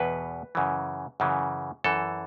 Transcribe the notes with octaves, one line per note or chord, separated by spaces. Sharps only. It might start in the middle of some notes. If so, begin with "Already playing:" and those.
Already playing: E2 B2 B4
F#2 C#3 E3
F#2 C#3 E3
F#2 E3 A4